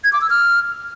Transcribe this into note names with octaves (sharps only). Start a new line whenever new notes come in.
G#6
D6
E6
F6